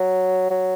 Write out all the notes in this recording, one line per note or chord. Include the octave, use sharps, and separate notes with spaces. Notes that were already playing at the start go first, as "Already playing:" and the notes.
Already playing: F#3
F#3